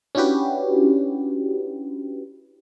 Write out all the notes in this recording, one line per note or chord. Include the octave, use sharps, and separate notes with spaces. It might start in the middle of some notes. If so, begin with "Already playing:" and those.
C#4 D4 E4 F#4 G4 B4